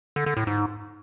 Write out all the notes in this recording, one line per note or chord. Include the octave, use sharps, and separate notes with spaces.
D3
D3
A2
G#2